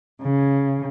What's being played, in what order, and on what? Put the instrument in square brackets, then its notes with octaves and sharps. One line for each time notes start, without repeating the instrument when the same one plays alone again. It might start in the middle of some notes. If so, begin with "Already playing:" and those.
[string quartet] C#3